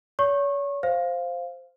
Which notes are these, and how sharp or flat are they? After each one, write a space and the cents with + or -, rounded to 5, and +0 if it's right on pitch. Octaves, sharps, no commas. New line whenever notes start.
C#5 +40 C#6 -25
C5 +0 F5 +0